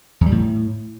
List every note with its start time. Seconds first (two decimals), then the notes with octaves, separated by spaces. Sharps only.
0.21 E2
0.26 G3
0.31 A2